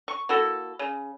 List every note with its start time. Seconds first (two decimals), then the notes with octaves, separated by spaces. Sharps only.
0.08 C#6
0.29 A#3 E4 F#4 A4
0.79 C#3